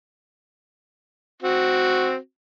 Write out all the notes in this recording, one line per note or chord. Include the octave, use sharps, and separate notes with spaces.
C4 F#4